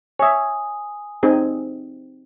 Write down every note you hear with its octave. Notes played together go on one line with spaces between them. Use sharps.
C#5 E5 G#5 D#6
C4 D#4 G#4